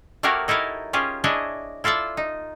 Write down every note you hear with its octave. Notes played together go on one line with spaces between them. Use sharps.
A3 A#3 F#4 G4 A#4 C#5
D#4 E4 A4 A#4 C#5
C#4 F4 G4 G#4
D4 E4 G#4 C#5 D#5
E4 F4 A4 D5 E5
D#4